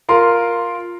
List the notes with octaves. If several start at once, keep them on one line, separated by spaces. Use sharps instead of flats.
F4 A#4 C6